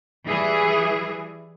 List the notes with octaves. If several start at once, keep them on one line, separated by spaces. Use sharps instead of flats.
E3 G3 G#4